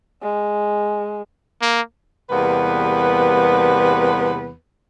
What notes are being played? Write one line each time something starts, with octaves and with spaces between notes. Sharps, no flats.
G#3
A#3
E2 C3 G3 A#3 B3 B4